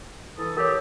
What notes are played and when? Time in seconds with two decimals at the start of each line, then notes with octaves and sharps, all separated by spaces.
0.37 E3 A4 D#6
0.57 G4 A#4 C#5